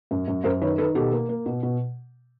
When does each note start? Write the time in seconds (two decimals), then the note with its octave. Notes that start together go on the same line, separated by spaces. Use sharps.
0.11 F#2
0.28 F#2
0.44 F#2 A#4 C5
0.62 D#3 B4 C#5
0.78 D#3 A4 B4
0.95 B2 G4 A4
1.13 A#3
1.29 A#3
1.46 B2
1.63 B2